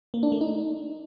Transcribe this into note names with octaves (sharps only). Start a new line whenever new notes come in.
A#3
D4
A3
D#4